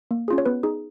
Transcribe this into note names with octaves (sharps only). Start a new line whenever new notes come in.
A#3
C#4 F4 G#4
C#5
B3 B4
D#4 G#4